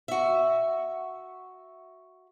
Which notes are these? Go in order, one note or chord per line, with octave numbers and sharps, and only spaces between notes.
F#4 E5